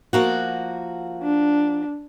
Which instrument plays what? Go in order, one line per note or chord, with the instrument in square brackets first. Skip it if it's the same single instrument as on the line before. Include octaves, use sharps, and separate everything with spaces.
[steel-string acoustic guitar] F3 A#3 F#4
[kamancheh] D4